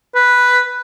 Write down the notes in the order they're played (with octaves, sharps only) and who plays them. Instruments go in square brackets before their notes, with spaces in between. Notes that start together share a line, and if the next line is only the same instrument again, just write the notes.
[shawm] B4